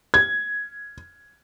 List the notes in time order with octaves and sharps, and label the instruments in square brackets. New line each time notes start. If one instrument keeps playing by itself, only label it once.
[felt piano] G#6